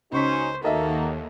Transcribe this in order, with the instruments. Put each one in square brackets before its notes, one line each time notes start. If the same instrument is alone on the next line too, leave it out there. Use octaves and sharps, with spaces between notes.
[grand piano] C#2 C#6 B6 [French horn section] C#4 D#4 F#4 [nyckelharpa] C5
[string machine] D#2 [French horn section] A#3 D#4 F#4 [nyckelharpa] A4 [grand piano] A#4 D#5 E5